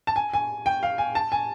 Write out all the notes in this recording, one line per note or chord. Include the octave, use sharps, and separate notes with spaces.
A5
G#5
G#5
G5
F5
G#5
A5
G#5